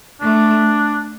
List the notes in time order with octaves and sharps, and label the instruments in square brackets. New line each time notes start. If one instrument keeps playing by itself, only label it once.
[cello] A3 [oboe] D4